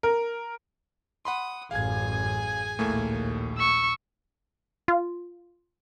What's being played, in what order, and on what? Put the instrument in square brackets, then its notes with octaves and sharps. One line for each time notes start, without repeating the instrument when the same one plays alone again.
[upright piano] A#4
[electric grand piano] F#5 B5 C6 [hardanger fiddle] D#6
[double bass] A1 F#2 [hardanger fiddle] G#4 G#5 [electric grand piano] F5 G#6
[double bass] A#1 D#2 [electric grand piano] A2 A3 A#3
[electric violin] C#6 E6
[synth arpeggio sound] F4